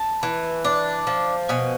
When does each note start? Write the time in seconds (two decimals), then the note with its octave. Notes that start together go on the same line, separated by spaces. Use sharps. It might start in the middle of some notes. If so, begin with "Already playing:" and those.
Already playing: A5
0.23 E3
0.65 D4
1.07 F3
1.49 B2 G#5